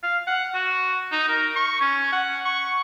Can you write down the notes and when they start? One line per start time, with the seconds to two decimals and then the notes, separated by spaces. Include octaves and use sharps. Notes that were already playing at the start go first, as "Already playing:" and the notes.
0.03 F5
0.27 F#5
0.54 F#4
1.12 D#4
1.29 A#4
1.56 C#6
1.81 C#4
2.13 F#5
2.45 C#6